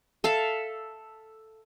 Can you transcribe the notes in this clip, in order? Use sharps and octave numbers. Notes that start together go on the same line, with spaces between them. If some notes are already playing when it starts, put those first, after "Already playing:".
A4 E5 F5